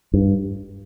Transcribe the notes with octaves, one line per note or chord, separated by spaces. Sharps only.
G2